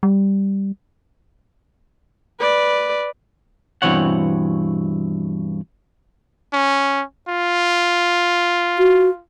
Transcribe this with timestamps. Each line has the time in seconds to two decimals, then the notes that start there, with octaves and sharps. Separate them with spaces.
0.03 G3
2.40 B4 D5
3.82 G2 B2 E3 C4 C#5 F#5
6.53 C#4
7.28 F4
8.78 F#4